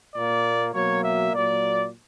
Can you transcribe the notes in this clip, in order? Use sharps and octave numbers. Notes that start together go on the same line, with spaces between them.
A#2 A#3 D5
B2 F#3 A#3 C#5
E5
A#2 F#3 A#3 D5